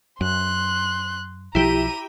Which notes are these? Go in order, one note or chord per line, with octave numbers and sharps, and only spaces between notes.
F#2 C6 F#6
B1 F3 E4 G4 A#5 D#7